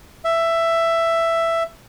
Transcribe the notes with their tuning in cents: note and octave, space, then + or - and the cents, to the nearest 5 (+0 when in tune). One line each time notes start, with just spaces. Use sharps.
E5 +10